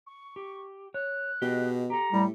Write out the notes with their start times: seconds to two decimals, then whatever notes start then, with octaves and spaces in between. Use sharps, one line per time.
0.07 C#6
0.36 G4
0.94 C#5 F#6
1.42 B2 G4 G#4 D#5
1.90 G4 A4 A#5
2.13 A2 G3